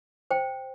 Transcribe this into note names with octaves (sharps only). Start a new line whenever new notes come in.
C5 G5